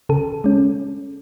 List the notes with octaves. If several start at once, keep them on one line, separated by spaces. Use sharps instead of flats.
C#3 A4
G#3 C#4